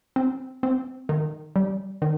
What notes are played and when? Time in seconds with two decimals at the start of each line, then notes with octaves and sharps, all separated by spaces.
0.16 C4
0.63 C4
1.09 D#3
1.56 G3
2.02 D#3